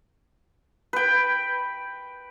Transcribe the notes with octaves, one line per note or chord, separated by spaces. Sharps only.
B4 G5